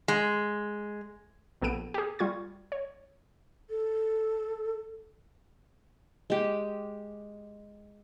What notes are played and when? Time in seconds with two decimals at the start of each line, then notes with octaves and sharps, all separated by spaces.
0.08 G#3
1.62 A#1 B3 A4 G5 D7 D#7
1.94 G4 G#4
2.19 G3 F4 C#6 G#6
2.72 C#5
3.70 A4
6.30 G#3 G4